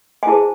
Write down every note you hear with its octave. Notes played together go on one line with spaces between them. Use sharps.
G#5
E4 G#4 C5 A5